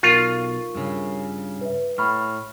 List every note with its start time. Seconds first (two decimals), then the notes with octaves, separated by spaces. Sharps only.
0.03 B1 F4 A#4 C#6
0.75 G2 C#3
1.61 B4 E5
1.98 A2 B5 C#6 F6